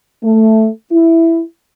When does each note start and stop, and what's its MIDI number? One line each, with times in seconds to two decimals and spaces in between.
0.24 0.68 57
0.92 1.41 64